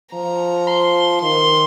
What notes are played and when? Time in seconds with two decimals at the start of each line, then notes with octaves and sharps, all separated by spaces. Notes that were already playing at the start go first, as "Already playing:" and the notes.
0.14 F3 A#5
0.67 C6
1.22 D#3 C6